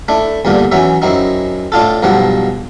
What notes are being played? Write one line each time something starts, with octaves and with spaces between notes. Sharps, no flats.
A3 D4 E4
E2 G2 A#2 D3
E3 F#3 C#4 E5
F#2 C4 D#4 E4
A2 D4 F4 A4
B1 G2 F3 C4 F#5